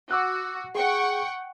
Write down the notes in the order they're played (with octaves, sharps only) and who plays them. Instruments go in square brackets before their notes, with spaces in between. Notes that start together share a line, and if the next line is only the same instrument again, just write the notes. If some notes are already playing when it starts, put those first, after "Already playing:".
[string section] F#4 [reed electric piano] D6 E6 F#6
[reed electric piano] G#4 [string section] F#5 G5 C#6